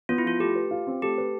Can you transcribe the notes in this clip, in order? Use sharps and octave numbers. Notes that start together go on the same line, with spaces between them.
B3 F4
E4
F3 F4
A3 G4
B4
F4
C4
A3 G4
B4